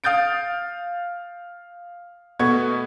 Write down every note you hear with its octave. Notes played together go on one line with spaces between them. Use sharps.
F5 D#6 G6 A6 D7
B2 A3 B3 C#6 G#6